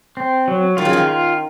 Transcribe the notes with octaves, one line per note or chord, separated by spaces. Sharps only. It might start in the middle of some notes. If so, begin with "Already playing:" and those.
C4
F#3
D#3 F4
C#3
D#3
F4